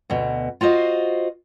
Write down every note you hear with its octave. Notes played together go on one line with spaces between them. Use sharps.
D2 B2
F4 F#4 C5 D#5